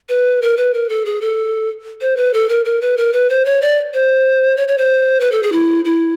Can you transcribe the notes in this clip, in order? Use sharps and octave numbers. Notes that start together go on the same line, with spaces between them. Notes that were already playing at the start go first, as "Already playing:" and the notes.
B4
A#4
B4
A#4
A4
G#4
A4
C5
B4
A4
A#4
A#4
B4
A#4
B4
C5
C#5
D5
C5
C#5
C#5
C5
B4
A4
G#4
E4
E4